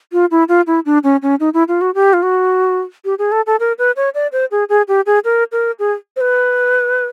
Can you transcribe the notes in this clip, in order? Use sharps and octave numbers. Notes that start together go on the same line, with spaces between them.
F4
E4
F4
E4
D4
C#4
C#4
D#4
E4
F4
F#4
G4
F4
F#4
G4
G#4
A4
A4
A#4
B4
C#5
D5
C5
G#4
G#4
G4
G#4
A#4
A#4
G#4
C5
B4